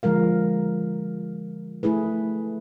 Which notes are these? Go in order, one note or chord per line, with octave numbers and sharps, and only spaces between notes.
D3 F3 G#3 A#4 F5
A3 E4 G#4 B4